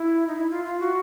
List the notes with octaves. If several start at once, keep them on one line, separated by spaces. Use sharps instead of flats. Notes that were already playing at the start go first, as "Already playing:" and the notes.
Already playing: E4
D#4
E4
F4
F4
F#4